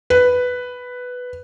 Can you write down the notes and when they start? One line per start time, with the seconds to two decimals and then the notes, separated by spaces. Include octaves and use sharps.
0.10 B4